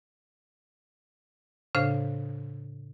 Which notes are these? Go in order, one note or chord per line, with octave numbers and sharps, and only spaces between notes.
A2 C#3 D4 C5 F5